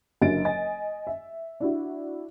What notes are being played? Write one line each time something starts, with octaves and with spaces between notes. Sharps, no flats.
F#1 F#2 D3 D#5 A6 D7
D#5 G#5 A6
E5
D4 E4 F#4